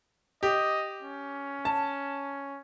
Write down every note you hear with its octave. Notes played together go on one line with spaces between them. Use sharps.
G4 D#5
C#4
A5